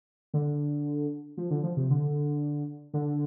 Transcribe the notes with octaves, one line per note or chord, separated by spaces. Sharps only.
D3
F3
D3
F3
C3
D3
D3